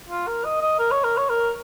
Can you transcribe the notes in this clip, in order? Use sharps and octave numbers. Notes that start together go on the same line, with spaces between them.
F4
A#4
D#5
D#5
A#4
C#5
A#4
C#5
A#4